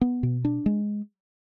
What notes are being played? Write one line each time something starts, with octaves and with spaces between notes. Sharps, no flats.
B3
B2
D4
G#3